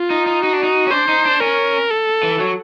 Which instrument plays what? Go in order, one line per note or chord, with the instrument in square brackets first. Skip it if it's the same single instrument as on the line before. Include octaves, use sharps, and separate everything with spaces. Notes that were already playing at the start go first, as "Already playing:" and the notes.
Already playing: [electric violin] F4
[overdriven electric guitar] D#4
D#4
[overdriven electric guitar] D#4 [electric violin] F#4
[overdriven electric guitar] D4
D#4
C#4
[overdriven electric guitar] D4 [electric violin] C5
[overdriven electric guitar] D#4
D4
[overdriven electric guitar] C#4 [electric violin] A#4
[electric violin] A4
[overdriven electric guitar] E3
F#3